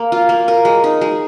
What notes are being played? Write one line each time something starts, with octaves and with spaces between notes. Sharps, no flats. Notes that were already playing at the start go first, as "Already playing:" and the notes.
Already playing: A#3
F4
A#3
A#4
G#3
D#4
G#3